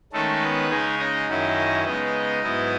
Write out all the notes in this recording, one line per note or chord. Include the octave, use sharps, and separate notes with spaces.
D#3 G#3 A3 C#4 A4
B3 B4
C#3 G#3 C#4 D#4 C#5
D#4 D#5
F#2 D#3 F#3 C#4 E4
C#3 G#3 B3 D#4 D#5
G#2 F#3 B3 E4